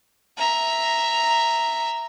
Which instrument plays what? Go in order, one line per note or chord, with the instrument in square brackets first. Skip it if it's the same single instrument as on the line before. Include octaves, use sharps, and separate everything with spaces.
[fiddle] E5 A#5